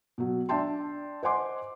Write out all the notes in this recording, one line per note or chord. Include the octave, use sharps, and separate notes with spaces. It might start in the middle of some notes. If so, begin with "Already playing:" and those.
B2 F#3
D4 D5 E5 G5 A5 C6
C5 D#5 F#5 G#5 C6 D6